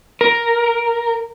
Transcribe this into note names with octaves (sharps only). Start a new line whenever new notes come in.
A#4